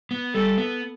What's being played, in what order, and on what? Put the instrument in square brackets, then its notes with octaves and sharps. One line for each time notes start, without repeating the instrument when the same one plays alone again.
[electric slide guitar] B3
[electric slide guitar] G3 [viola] A4
[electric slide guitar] B3